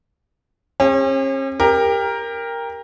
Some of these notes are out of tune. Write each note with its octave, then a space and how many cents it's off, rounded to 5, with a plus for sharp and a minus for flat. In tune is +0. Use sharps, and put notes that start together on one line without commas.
C#4 -40 G4 +45
G4 +25 A#4 +0